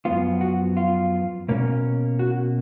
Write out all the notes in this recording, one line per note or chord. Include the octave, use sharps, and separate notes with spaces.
F#2 F3 B3 F4
F#4
F4
B2 A#3 C#4
F#4